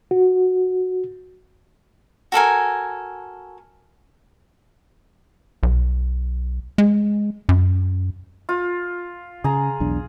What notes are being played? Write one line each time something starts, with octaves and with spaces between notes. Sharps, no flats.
F#4
F#4 A4 A#4 G#5
B1
G#3
F#2
F4
C#3 G#4 A#5
B1 E2 D4